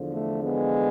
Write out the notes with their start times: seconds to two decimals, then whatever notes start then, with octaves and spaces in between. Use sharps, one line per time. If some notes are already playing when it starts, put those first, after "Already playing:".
Already playing: E2 D3 F3
0.13 A3
0.43 G#3 B3